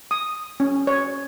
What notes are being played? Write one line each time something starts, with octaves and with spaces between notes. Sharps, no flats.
D#6
C#4
C#5